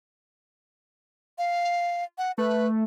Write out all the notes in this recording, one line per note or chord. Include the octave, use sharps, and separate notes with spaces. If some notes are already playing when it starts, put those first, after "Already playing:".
F5
F#5
A3 B4